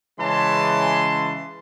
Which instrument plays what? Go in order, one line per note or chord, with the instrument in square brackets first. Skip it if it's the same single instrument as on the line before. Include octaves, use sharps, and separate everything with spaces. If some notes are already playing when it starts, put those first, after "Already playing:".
[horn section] C#3 E3 G#3 C#4 A5 C6